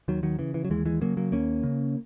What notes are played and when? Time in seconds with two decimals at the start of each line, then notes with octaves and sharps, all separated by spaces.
0.08 D#2 D#3 F#3
0.23 D#3 F#3
0.39 C#3 E3
0.54 E3
0.65 F#3
0.70 D#2 E3 G#3
0.86 E3 G#3
1.01 C#3 F#3 A#3
1.17 F#3 A#3
1.32 D#2 A#3 C#4
1.63 C#3